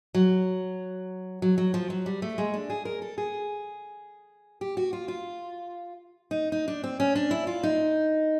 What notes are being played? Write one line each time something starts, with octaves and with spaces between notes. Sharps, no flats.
F#3
F#3
F#3
F3
F#3
G3
A3
G#3
D4
G#4
A#4
A4
G#4
G4
F#4
F4
F4
D#4
D#4
D4
C4
C#4
D4
E4
F4
D#4